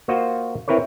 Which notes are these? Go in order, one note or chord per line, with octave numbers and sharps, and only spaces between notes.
A#3 F4 F#4 C5 D#5
C4 E4 A#4 B4 C#5